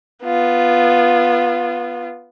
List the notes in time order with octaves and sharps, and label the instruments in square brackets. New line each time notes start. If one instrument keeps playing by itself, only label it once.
[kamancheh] B3 F4